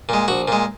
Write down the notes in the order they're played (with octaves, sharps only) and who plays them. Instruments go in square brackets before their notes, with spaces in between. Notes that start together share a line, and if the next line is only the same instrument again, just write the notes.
[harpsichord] A#2 G#3
A#1 F#4
A#2 G#3